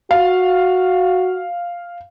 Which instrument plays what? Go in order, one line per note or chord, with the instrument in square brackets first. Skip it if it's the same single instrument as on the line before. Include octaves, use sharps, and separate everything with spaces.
[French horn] F#4 [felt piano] F5